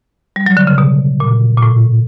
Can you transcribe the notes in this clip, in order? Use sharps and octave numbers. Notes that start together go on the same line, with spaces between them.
G3
F#3
D3
C#3
B2
A#2
A#2
A2